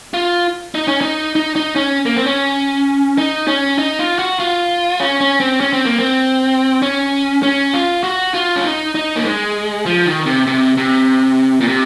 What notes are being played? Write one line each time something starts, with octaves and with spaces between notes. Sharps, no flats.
F4
D#4
C#4
D#4
D#4
D#4
C#4
A#3
C4
C#4
D#4
C#4
D#4
F4
F#4
F4
C#4
C#4
C4
C#4
C4
A#3
C4
C#4
C#4
F4
F#4
F4
C#4
D#4
D#4
A#3
G#3
F3
D#3
C3
C3
C3
A#2
C3